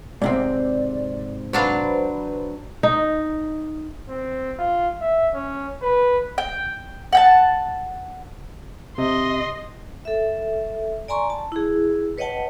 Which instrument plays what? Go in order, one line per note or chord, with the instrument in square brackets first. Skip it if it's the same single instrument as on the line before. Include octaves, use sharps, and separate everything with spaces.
[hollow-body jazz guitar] G#2 C3 C4 [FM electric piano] D5
[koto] F#3 D4 F5 [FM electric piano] B4 C5
[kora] D#4
[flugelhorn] C4
F4
E5
C#4
B4
[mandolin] G5
F#5 G5 A5
[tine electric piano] C3 [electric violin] D#5 C6
[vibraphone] A4 E5
D5 G#5 A#5 C6 C#6
A5
E4 G#4
B4 C#5 D#5 F#5 G5 A5